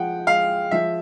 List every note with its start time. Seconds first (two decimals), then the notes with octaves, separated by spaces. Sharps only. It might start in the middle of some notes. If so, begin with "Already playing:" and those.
Already playing: F3 G#3 F#5 G5
0.27 G#3 F5
0.71 F3 E5